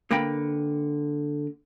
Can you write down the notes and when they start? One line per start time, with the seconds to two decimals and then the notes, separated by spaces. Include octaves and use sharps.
0.11 D3 A#3 A#4 B4 G5 B5